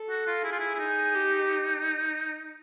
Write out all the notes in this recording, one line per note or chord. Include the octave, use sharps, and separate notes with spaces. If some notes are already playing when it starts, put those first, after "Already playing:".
Already playing: A4
F#4
F4
E4 G#4
F4
E4
E4
D#4
G4